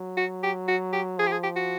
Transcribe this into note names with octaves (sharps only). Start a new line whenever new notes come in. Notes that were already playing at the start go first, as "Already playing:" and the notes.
Already playing: F#3
F#4
G4
F#4
G4
F3 G#4
G4
G#4
G4
F#4